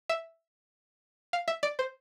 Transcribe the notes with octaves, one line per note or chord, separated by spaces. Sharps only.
E5
F5
E5
D5
C5